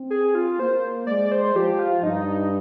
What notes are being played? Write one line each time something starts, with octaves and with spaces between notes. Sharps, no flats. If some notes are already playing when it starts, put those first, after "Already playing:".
Already playing: C4
G#4
F4
A#3 C5
G#3 D5
C5
F3 G4
F4
G2 D#4